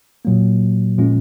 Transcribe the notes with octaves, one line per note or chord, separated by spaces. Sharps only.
A#2 F#3 A#3
A#2 F3 G#3 C#4 F4